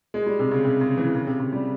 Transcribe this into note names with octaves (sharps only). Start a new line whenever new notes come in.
G#3
G3
C3
C#3
C3
C#3
E3
C#3
C3
C#3
G3